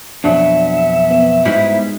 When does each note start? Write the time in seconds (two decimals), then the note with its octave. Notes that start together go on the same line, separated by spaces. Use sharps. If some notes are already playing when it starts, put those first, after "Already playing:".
0.24 F2 B2 F#3 D4 E5
1.11 B3
1.45 G#2 G3 G#3 D#4 E4 F#4